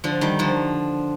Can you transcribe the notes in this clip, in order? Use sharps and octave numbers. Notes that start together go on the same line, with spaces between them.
D3 F3
D#3 G3
D3 F3